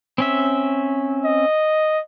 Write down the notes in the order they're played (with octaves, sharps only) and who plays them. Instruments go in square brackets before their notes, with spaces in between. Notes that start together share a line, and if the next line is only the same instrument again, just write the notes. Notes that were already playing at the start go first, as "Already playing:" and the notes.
[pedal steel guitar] C4 C#4 E5
[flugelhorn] D#5